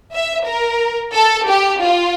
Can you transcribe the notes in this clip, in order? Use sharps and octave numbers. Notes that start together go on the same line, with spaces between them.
E5
A#4
A4
G4
F4